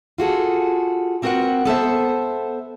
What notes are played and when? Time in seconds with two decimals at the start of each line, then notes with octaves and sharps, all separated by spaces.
0.18 F4 F#4 G#4 A4
1.22 A#3 C4 F#4 A#4 B4 F#5
1.65 B3 A4 C5 E5